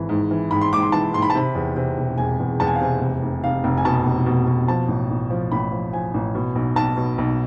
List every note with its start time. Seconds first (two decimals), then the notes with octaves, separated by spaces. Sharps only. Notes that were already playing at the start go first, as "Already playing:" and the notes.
Already playing: G#1 E3
0.09 G#2
0.31 E3
0.51 G#2 B5
0.61 C6
0.73 G#2 D6
0.82 C6
0.92 E3 A5
1.13 G#2 C6
1.22 B5
1.30 A5
1.35 C3 B5
1.55 E2
1.76 C3
1.98 E1
2.18 E1 G#5
2.39 E2
2.60 E2 A5
2.67 G#5
2.75 F5
2.81 C3 G#5
3.01 F1
3.22 F1
3.44 F1 F5
3.64 F1
3.77 G#5
3.85 B2 A5
4.06 F1
4.26 B2
4.47 B2
4.68 F3 A5
4.88 A1
5.10 A1
5.30 F3
5.51 A1 B5
5.72 F3
5.93 F3 G#5
6.14 A1
6.35 B2
6.55 B1
6.76 B1 A5
6.97 B2
7.18 B1